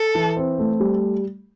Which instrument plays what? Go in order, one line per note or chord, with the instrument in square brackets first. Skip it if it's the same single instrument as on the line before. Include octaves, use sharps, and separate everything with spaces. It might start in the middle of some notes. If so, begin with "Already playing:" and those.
Already playing: [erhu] A4
[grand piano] E3
C4
A3
G3